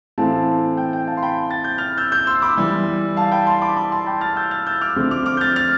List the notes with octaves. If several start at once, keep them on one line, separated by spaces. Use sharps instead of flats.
A2 E3 A3 C4 F5 A5
G5
G5
F5 A5
C6
G5 B5
A6
G6
F6 A6
E6 G6
E6 G6
C6 E6
B5 D6
E3 G3 B3
F5 A5
G5 B5
A5 C6
B5 D6
B5 D6
A5 C6
G5 B5
F6 A6
E6 G6
F6 A6
E6 G6
D6 F6
D3 F3 A3 C4
D6 F6
D6 F6
G6
F6 A6
F6 A6